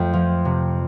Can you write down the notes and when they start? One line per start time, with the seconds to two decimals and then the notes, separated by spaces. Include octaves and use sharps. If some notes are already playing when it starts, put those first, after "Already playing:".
Already playing: F2 A3 G5
0.13 F3
0.45 C3